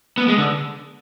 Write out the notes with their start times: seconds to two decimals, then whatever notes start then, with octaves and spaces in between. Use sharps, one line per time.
0.18 B3
0.28 G#3
0.38 D3